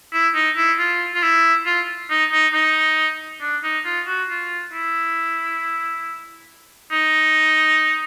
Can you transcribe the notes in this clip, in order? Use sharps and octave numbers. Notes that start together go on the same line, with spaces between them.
E4
D#4
E4
F4
F4
E4
F4
D#4
D#4
D#4
D4
D#4
F4
F#4
F4
E4
D#4